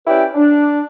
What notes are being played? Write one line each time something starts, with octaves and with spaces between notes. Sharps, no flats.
C#4 E4 G4 B4 D5 G5
D4